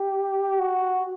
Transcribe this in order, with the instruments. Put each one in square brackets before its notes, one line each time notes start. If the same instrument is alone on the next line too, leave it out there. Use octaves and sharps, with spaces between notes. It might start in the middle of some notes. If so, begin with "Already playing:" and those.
Already playing: [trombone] G4
F#4